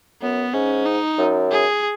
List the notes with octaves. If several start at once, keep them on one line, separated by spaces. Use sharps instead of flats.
F#2 B3
G#2 C#4
D#4
F#2
G#4